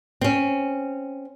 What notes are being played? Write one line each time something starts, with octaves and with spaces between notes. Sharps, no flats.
C4 C#4